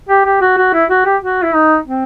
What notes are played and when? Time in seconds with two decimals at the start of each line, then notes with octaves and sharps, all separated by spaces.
0.09 G4
0.26 G4
0.42 F#4
0.58 F#4
0.74 E4
0.90 F#4
1.06 G4
1.22 F#4
1.43 E4
1.54 D#4
1.86 C4